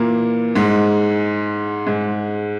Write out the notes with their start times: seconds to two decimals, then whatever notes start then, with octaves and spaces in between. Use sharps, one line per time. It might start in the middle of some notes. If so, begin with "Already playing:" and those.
Already playing: A#2 E3 A#3 E4
0.55 G#2 G#3
1.87 G#2 G#3